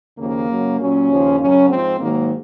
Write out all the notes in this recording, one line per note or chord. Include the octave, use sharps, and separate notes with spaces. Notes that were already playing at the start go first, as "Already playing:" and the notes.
D#2 C#3 F3 A#3
F#2 C#3 F#3
A#2 F#3 C#4
D#2 C#3 F3
F#2 C#3 F#3 C#4
G#2 F3 C4
G#2 D#3 F#3 A#3